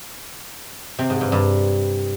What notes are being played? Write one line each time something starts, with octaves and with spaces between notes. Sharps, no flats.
C3
G#2
G2
G2